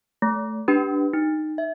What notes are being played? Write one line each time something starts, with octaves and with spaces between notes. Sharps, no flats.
A3
D4 G4 B4
D#4
E5